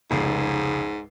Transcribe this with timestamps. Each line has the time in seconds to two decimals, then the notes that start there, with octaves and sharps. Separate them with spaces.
0.11 F1 C#2 G#2 C7